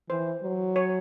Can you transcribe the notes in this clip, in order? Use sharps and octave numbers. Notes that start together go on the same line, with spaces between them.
E3 C5
F#3
C#5